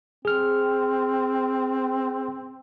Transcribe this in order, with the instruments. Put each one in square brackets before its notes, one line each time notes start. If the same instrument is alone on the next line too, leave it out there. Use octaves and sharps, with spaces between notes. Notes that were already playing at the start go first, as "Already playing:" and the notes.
[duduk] C4 [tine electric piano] G#4 F6